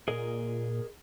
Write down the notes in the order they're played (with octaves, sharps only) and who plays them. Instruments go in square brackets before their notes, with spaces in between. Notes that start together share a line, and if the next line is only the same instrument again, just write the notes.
[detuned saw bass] A#2 [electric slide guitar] G#4 A#4 D#5